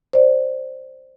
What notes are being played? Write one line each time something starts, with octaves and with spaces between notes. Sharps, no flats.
C5 D5